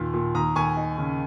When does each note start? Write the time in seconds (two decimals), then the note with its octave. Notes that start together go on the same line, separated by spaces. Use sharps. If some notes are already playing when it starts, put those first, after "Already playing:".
Already playing: D#2 A#2
0.14 A#2
0.35 D#2 A#5 D#6
0.56 D#2 G#5 C#6
0.77 D#4
0.98 C#3